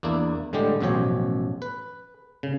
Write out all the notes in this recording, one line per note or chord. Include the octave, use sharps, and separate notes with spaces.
E2 A#3 D4 E4
A2 D3 G3 G#3 G4
A1 F#2 B2 F3 G4 C#5
B4
C#3